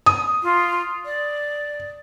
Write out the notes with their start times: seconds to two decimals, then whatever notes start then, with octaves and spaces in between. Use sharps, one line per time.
0.06 D#6
0.42 F4
1.05 D5